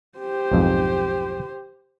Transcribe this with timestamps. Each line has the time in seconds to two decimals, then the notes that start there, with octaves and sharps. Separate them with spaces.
0.19 G4 C5
0.51 B1 F2 G#2